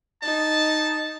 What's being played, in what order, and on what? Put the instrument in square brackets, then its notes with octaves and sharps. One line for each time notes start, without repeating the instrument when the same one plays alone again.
[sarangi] D#4 [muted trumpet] A5